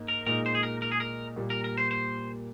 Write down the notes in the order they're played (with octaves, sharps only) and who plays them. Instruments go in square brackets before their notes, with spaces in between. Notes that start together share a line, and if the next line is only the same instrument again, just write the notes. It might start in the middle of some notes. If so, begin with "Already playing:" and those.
Already playing: [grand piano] G#2 A#3
[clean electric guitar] A#4
[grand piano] A#2 G#3 D#4 [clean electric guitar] A#4
[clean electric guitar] C5
G#4
A#4
A#4
G#4
A#4
[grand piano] A#2 G3 A#3
[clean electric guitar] A#4
A#4
C5
C5